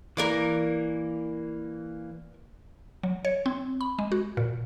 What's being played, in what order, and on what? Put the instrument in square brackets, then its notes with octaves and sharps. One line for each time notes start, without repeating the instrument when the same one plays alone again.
[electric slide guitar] E3 A#3 [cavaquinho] A#4 D5 D6
[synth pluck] F#3
C#5
C4
B5
G#3
F#4
A#2